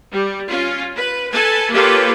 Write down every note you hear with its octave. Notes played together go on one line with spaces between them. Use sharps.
G3
C#4 F4
B4
A4 B4 G#5 A5
A#3 F4 G4 A4 B4 C#5